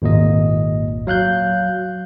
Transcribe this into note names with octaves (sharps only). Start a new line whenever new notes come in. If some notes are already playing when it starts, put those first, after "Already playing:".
G#1 D#2 A#2 D#5
F#3 F5 F#6 G6